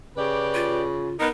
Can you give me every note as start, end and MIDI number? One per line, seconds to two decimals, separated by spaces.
0.17 1.17 49
0.17 0.83 67
0.17 0.83 71
0.17 0.83 74
0.54 1.17 65
1.19 1.27 59
1.19 1.27 63
1.19 1.29 70